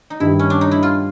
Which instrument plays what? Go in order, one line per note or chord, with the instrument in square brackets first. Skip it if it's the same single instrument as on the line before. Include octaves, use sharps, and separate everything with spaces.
[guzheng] D#4
[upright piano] G2 D#3 G3 [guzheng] E4
[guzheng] C#4
D4
D#4
E4
F4